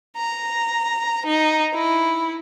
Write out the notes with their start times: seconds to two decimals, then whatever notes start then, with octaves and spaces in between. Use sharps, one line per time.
0.17 A#5
1.27 D#4
1.75 E4